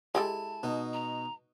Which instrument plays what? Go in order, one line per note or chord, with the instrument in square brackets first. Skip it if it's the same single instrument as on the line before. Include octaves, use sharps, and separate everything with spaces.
[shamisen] G#3 G4 A4 [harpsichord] E4 G#5 [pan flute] A5
[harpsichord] B2 D#4
[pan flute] A#5